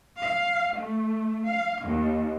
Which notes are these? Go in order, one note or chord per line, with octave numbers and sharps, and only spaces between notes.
F5
A3
F5
D#2